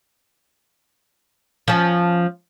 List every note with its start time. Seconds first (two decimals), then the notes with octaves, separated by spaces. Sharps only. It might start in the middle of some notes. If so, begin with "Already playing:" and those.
1.68 F3 C#4